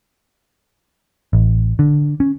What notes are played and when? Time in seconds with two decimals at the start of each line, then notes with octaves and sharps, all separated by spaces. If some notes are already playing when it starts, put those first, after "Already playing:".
1.33 A1
1.79 D3
2.20 C#4